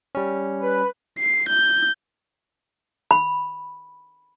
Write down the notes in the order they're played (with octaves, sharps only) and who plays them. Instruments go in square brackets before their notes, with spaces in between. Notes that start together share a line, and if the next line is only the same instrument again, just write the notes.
[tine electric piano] G3 C#4
[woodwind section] B4
[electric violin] C7
G6
[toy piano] B5